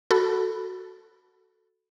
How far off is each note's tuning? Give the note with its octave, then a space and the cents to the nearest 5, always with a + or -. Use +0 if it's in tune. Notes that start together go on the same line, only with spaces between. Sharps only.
F#4 +0 A4 +0 B5 +0